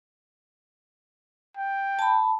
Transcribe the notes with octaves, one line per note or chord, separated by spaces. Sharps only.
G5
A5 B5